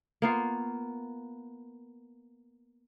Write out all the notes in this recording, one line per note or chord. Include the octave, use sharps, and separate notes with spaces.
A#3 B3 F4